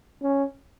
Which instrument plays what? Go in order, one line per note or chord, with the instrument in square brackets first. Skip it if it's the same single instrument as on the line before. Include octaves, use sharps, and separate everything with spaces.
[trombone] C#4